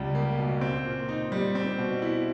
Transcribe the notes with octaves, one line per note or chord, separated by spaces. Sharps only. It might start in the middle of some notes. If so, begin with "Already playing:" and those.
Already playing: C#2 C#3 G3
A#3
B2
C4
A#2
D#4
G3
C4
B2
E4